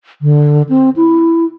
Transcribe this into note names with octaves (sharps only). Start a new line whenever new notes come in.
D3
C4
E4